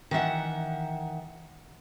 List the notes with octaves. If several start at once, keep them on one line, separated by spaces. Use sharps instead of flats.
D#3 E3 E5 F#5